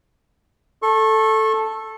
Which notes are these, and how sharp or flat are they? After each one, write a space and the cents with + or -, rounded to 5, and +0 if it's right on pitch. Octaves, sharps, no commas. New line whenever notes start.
A4 +0 C#6 -30